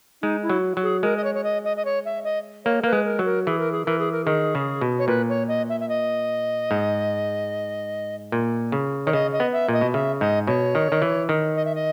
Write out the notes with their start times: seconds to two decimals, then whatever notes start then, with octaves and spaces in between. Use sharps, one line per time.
0.22 G#3 D#4
0.43 E4
0.49 F#3
0.77 F#3
0.83 G#4
1.03 G#3 A#4
1.17 D#5
1.24 C#5
1.35 C#5
1.44 D#5
1.65 D#5
1.77 D#5
1.85 C#5
2.05 E5
2.24 D#5
2.65 A#3 C#5
2.81 A#3 A#4 B4
2.93 G#3
3.05 A#4
3.19 F#3
3.26 A#4
3.46 E3 G#4
3.59 A#4
3.72 G#4
3.85 E3 A#4
3.99 G#4
4.12 A#4
4.24 D#3 G#4
4.55 C#3
4.81 B2
4.99 C#5
5.08 A#2 B4
5.29 C#5
5.48 D#5
5.69 E5
5.80 E5
5.89 D#5
6.71 G#2
8.32 A#2
8.72 C#3
9.06 D#3 C#5
9.13 C#3 D#5
9.33 D#5
9.40 B3
9.53 E5
9.69 A#2 D#5
9.81 B2
9.93 C#3 E5
10.20 G#2 D#5
10.47 B2 C#5
10.75 D#3
10.92 D#3
11.02 E3
11.29 D#3
11.56 D#5
11.65 E5
11.75 D#5